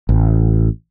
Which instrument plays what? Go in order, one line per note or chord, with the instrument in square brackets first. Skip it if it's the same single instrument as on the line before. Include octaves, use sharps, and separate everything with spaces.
[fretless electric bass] A1